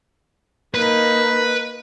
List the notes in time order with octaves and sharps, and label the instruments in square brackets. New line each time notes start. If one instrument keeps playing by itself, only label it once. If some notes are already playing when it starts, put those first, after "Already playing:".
[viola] A#3 D#4 [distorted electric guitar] B4